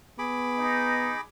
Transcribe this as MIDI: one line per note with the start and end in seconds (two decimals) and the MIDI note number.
0.19 1.13 59
0.19 1.21 68
0.19 1.21 83
0.19 1.21 86
0.56 1.18 63